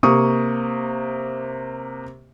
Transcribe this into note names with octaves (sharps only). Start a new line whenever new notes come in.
C3 A#3 C#6 D#6